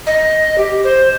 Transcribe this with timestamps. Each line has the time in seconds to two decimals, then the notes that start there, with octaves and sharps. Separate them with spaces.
0.07 D#5
0.58 G4
0.84 C5